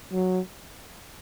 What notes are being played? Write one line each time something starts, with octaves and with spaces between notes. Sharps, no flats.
F#3